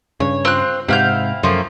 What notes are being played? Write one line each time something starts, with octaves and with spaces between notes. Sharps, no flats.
G2 C#3 C#5
C4 F4 F#6
G#2 C3 C4 E4 F5 F#5 G6
F#2 F3 A3 A#3